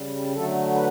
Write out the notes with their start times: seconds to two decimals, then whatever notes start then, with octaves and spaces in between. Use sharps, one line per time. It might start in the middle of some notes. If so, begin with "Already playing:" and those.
Already playing: C#3 G3
0.33 D3 F#3 A3 A4
0.74 B4